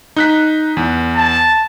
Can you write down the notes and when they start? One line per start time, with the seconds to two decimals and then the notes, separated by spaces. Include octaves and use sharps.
0.16 D#4 F#6 B6
0.77 E2
1.16 A5